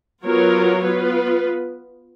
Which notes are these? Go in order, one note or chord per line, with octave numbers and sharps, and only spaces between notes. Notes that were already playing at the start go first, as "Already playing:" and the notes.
F#3 B3 F4 A#4 C#5
B3 F4 B4